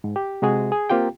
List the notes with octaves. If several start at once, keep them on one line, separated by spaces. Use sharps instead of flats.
G#2
G4
C3 G#3 F#4 G#4
G#4
A#3 C4 F4 G4 G5